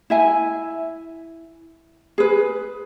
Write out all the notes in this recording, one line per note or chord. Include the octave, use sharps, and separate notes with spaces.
E4 E5 G#5
G#4 B4